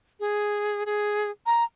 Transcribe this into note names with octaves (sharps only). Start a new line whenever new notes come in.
G#4
G#4
A#5